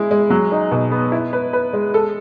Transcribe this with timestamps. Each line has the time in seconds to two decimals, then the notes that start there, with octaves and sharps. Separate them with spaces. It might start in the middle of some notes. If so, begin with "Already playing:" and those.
Already playing: G#3 E4
0.11 G#3
0.30 F#3
0.52 D#4
0.71 B2
0.91 B3
1.12 E4
1.33 B4
1.53 B4
1.73 G#3
1.94 A4